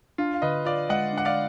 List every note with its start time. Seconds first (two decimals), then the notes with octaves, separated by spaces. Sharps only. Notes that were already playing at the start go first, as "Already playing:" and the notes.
0.18 D4 F4
0.34 F5
0.42 D3 B4 D#5
0.65 F4 D5 F5
0.89 G#3 D#5 F#5
1.13 D4 F#5
1.25 D5 F5